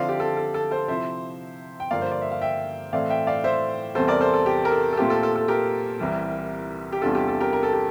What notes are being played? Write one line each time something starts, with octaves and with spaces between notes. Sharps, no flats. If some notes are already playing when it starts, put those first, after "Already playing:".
Already playing: D3 F3 C4 E4 D5 F5
G4
A4
A4
A4
A4 C5
C3 F3 C4 E4 C5 E5
G5
G2 D3 F3 A#3 D5 F5
C5
D5
E5
F5
E5 G5
A2 E3 A3 C4 D5 F5
E5 G5
D5 F5
C5 E5
E2 C3 E3 G3 C4 A4 C5
A#4 D5
A4 C5
A4
G4
A#4
A4
A4
A#2 A3 C4 F4 G4
A4
A4
A4
G4 A#4
C2 C3 E3 G3
G4
E2 C3 G3 D4 F4 A4
G4
A4
G4 A#4
A#4
A4
G4